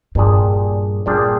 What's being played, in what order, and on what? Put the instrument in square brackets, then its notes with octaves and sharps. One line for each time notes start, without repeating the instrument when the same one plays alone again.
[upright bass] G2 [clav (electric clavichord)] A#2 G3 D4 G#4
[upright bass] G2 [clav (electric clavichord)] A#2 G3 D4 G#4